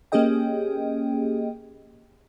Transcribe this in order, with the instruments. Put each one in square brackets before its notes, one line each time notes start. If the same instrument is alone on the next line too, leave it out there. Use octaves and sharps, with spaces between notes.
[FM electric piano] A#3 C#4 G4 G#4 D#5 G5